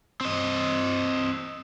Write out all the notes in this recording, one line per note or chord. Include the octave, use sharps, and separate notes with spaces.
C4 D#5